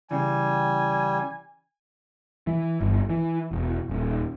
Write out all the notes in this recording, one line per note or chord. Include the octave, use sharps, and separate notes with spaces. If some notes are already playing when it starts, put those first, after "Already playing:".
C#3 E3 G3 G#5
E3
G1
E3
E1
D#1